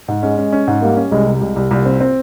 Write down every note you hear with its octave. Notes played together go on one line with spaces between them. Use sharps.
G#2
G#3 C#4
C#4
C#4
G#2
G3 A#3
C#4
C2 G#3
C3
C2 G#3
C2
C2 A#2
C4
C4